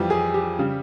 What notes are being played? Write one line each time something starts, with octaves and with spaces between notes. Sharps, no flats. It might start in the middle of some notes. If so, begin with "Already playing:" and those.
Already playing: F2 E3 G3 G4
G#4
G4
C#3 G3